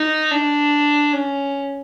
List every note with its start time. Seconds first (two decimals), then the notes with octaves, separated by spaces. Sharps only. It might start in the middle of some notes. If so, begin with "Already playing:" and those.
Already playing: D#4
0.31 D4
1.13 C#4